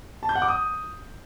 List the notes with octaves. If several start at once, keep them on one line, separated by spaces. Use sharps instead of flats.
A5
G6
F#5
D6
D#6